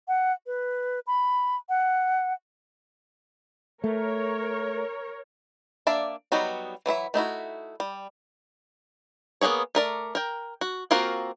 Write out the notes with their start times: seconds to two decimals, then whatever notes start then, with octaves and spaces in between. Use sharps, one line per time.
0.08 F#5
0.47 B4
1.07 B5
1.69 F#5
3.84 A3 A#4 C#5
5.87 A#3 D4 D5 E5
6.32 F#3 G3 B3 D#4 F#4
6.86 E3 F#3 E4 E5
7.14 A3 D#4 E4 F#4
7.80 G3
9.41 A#3 B3 C#4 G#4 C#5
9.75 A3 A#4 D5
10.15 A#4 G5
10.61 F#4
10.91 A#3 C4 F4 F#4 A#4